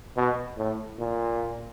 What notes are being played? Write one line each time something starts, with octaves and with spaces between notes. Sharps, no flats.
B2
A2
A#2